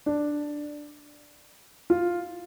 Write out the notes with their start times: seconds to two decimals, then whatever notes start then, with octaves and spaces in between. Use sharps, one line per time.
0.06 D4
1.90 F4